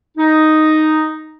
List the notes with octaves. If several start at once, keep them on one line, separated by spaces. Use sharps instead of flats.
D#4